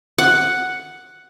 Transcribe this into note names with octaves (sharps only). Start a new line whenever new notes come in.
F#5